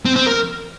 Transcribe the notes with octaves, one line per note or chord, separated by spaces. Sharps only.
C4
C4
A#4